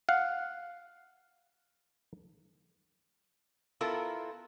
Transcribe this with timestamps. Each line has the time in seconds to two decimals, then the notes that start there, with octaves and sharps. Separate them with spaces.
0.09 F5 F#5
3.81 B3 E4 F4 A4 A#4